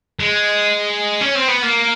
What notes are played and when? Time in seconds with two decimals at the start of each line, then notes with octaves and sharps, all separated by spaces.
0.20 G#3
1.21 C#4
1.35 C4
1.48 B3
1.63 A#3